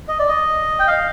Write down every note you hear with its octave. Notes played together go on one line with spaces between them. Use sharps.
D#5
D5
D#5
G5
F5